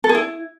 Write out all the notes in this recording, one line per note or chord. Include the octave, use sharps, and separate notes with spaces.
A4
G#4
E4